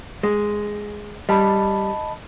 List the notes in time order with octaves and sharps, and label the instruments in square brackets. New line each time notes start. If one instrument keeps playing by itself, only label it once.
[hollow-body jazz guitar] G#3
[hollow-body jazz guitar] G3 [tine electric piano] D#5 A5 B5